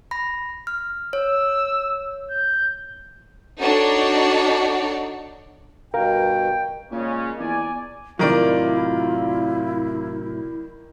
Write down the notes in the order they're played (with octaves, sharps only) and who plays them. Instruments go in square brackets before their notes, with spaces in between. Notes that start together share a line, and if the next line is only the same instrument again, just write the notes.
[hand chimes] B5 A#6
F6
[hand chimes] C#5 [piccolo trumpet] E6
[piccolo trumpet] G6
[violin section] D4 D#4 F#4 A4 C#5 D5
[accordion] G2 B2 [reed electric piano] A#4 F5 A#5 [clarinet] G5
[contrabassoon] A#2 [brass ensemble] C#3 G#3 C#4
[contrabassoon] E2 [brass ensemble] D5 G#5
[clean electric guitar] A2 C3 F#3 [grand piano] D#3 A#4 D5 [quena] E4 [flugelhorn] F4